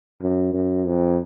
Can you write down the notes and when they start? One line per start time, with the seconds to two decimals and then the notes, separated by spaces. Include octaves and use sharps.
0.22 F#2
0.54 F#2
0.86 F2